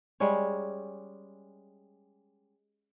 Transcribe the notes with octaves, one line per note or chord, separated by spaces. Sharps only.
G3 G#3 C#4 C#5